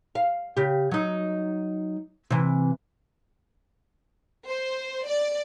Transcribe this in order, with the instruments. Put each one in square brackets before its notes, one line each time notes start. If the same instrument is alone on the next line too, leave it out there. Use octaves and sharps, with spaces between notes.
[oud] F5
C#3 G4
F#3 D#4
C3 E3
[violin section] C5
D5